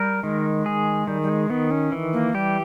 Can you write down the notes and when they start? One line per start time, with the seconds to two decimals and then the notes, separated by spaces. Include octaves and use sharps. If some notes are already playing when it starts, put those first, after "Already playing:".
Already playing: G3 A#4
0.23 D#3 G#3
0.66 G#4
1.07 D#3 G3
1.22 G3
1.29 G#3
1.50 D#3 B3
1.71 C#4
1.92 E3
2.13 A#3
2.35 G3 G4